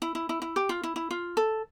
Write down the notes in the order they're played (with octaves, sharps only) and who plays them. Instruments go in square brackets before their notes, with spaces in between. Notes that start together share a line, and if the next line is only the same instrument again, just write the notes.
[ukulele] E4
E4
E4
E4
G4
F4
E4
E4
F4
A4